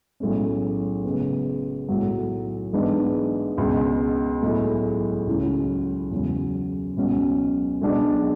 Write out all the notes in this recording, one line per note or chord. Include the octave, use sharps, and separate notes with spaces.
B1 A2 G#3 C#4
C#3 G#3 B3
B1 A2 F#3
A1 G#2 G#3 B3 D4
C#2 B2 G#3
B1 A2 G#3
C#2 C#3 F#3 C#4 E4
E2 C#3 F#3 C#4
C#2 B2 F#3 C#4
B1 B2 G#3 D4